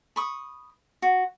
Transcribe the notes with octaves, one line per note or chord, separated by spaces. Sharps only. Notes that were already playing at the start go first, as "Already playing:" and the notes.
B5 C#6 D#6
F#4